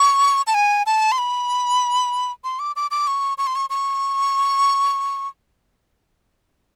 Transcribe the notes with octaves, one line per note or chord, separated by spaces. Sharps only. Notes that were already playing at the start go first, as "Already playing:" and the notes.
Already playing: C#6
A5
G#5
A5
C6
B5
C6
D6
D6
D6
C#6
C#6
C6
C#6
C#6